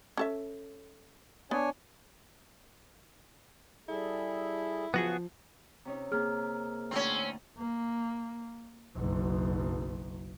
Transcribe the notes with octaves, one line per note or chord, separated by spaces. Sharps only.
C#4 A4 E5
B3 D4 C#5 G#5
G3 E4 G#4 A4
C#3 F3 B3 F#4 G#4
C3 C#4 D#4
C3 A#3 G#4 F6
D2 A2 C4 C#4 E4
A#3
F#1 B1